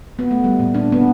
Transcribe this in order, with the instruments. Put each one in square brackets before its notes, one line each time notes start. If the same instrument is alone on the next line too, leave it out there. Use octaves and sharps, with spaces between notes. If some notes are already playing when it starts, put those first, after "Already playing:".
[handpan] B3
A3
G3
A#2
D4
B3